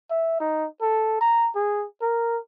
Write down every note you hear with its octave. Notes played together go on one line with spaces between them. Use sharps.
E5
D#4
A4
A#5
G#4
A#4